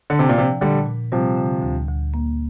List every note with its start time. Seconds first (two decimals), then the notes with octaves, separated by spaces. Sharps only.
0.10 D3 D4
0.19 C3
0.29 A#2
0.36 C3 F3
0.61 A#2 D3 G3
0.86 A#2
1.12 C3 F3 G3
1.37 D3
1.62 D2
1.88 D2
2.14 A#3